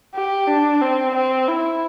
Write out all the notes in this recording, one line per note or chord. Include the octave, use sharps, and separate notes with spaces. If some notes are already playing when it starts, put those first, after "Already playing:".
G4
D4
C4
C4
E4